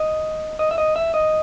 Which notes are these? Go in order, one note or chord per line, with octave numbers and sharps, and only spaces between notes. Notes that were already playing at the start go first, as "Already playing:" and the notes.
Already playing: D#5
D#5
E5
D#5
E5
D#5